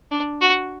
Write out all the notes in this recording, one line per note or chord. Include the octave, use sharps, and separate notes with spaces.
D4
F#4